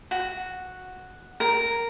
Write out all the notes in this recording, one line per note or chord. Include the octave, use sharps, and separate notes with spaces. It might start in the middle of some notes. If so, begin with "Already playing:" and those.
F#4
A#4